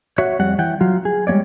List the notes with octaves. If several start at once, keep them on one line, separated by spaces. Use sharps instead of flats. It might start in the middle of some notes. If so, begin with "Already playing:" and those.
F#4 C#5 E5 F#5
F2 G3 F#5
E3 F#5 G5
F#3 F4
G#4
G3 G#3 A#3 C#5 D5